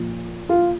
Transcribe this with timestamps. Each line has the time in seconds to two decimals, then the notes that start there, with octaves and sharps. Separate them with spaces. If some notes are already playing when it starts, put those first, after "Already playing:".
Already playing: A#2 F3
0.49 F4